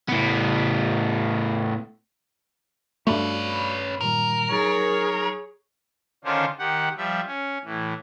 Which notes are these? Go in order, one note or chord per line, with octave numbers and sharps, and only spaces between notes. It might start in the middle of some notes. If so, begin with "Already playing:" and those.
A2 B3
G2 A3 C#4 F#4 B4 D5 F5
A#2 D#3 G3 A#4
F#3 D#4 G#4 C#5 A6
D3 D#3 C#4 D4 F4 C5
D#3 G4 F#5
F3 G3 E5
C#4
A2 E3